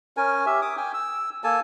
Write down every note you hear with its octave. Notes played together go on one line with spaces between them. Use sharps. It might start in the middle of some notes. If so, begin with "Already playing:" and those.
C#4 A#4 G#5
G4 E5
D6 D#6
G5 G#5
E6
A#3 A4 G#5 A5